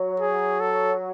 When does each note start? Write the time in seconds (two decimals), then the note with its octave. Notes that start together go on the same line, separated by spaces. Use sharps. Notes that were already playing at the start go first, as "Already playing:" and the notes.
Already playing: F#3
0.20 G#4
0.60 A4